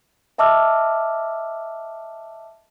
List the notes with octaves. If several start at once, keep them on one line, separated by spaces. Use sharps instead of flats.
D#5 E5 A5 D6 E6 F6